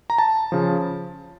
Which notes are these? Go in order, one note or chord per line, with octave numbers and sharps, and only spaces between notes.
A#5
A5
C#3 F3